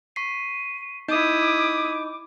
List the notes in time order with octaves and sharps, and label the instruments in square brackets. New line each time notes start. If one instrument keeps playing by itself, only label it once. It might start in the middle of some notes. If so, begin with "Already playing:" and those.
[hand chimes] C#6 B6 C7 [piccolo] D#7
[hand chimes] D#4 D#5 G6 [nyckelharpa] E4 D#6 [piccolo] D6